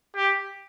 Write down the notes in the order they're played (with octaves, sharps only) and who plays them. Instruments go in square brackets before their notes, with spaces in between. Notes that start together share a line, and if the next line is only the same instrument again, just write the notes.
[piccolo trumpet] G4